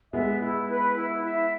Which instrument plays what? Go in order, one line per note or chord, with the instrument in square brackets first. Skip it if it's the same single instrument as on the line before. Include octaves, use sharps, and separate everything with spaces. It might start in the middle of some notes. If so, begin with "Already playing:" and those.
[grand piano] G#3 B3 [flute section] E5
[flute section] E4
B4
E4
E5